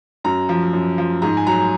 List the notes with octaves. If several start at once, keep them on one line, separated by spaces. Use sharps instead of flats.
F#2 A#5
F3
F#2
F3
G#2 A#5
G#5
F#3 A#5